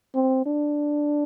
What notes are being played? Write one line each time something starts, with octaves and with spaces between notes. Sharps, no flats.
C4
D4